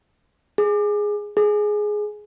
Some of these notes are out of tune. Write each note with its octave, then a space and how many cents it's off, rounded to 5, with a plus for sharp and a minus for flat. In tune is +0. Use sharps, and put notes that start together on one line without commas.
G#4 +0
G#4 +10